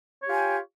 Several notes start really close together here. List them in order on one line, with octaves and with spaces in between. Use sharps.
C#5 G4 F4 G#5 G5